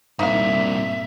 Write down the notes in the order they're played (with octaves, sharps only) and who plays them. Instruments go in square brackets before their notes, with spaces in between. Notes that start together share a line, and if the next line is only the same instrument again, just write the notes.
[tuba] C2 [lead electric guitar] G2 A#2 [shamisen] D#4 F5 [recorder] E5